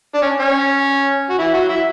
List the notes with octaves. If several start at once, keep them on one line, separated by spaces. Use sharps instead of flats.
D4
C#4
C#4
F#4
E3 E4
F#3 F#4
E4 E5